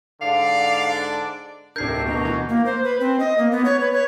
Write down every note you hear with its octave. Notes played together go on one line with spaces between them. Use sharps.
G#2 D3 D5 F5
D4
D1 C3 D4 A4 A#4 G6 G#6 C7
D2 B2 D3 D#5 A#5 C#6
E3 F#4
A#3
C5
B4
C4
D#5
A#3
B3
C#5
B4
C#5